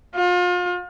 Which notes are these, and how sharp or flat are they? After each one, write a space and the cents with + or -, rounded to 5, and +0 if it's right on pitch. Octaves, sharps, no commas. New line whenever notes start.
F4 +35